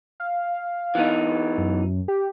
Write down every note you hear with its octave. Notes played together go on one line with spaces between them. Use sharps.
F5
E3 B3 D#4
F#2
G4